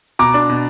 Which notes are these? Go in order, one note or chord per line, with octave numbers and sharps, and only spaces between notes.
B2 A#5 D6
D4
B2